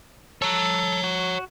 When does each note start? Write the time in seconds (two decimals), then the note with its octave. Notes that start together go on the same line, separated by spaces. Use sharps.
0.42 A4 C#5 A#5
1.04 F#4